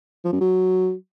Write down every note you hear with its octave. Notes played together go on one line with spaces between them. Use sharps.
F3
F#2
F#3